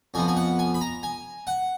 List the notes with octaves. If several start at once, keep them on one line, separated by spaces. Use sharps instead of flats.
F2 F3 B3 G#5
G#5
F#5
G#5
B5
A#5
G#5
F#5